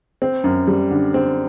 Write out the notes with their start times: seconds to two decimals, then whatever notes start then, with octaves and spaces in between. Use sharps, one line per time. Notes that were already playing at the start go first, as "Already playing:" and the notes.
0.22 C4
0.44 F#2
0.68 G3
0.91 D3
1.14 C4